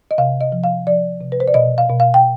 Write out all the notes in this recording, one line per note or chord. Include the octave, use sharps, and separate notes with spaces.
D#5
C3 F5
D#5
F3
F5
F3 D5
C3
B4
C5
D5
B2 D#5
F5
B2
F5
G5